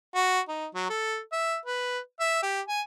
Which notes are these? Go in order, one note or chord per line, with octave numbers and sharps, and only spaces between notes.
F#4
D#4
F#3
A4
E5
B4
E5
G4
G#5